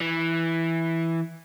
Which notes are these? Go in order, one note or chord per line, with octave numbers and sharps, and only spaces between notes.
E3